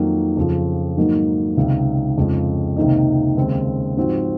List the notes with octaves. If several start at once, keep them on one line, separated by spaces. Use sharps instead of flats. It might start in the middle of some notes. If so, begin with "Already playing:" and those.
Already playing: F2 D#3 F#3 A#3
F2 C#3 F3
G#2 D#3 F#3 A#3 D#4
C#2 C3 D#3
F2 C#3 G#3 D#4
C#2 C3 D#3 A#3 D#4
D#2 C#3 G#3 C4
G#2 F3 C4 F#4